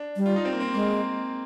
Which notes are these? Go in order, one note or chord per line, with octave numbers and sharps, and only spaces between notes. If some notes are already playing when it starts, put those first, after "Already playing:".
Already playing: D4
G3
F4
D#4
C4
A#3
C4
G#3 A#3